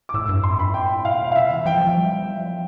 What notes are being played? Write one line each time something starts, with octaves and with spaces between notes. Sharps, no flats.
D6
A2 E6
G2
F2 C6
G2 B5
A2 G5
B2 F5
F5
C3 E5
E3
F3 G5
F3
G3
F3